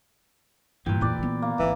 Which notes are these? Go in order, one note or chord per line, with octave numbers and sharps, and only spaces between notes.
G2 A#2 E3 B4 G5
E2 A2 B4 D5
D3 B3
A#3
G#1 E3